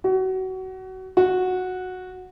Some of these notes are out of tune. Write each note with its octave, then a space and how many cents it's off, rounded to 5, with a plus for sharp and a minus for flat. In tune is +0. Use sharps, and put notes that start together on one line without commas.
F#4 +25
F#4 -10